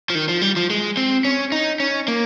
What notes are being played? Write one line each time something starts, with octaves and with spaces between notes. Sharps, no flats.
F3
D#3
F3
G3
F3
G#3
C4
C#4
D#4
C#4
A#3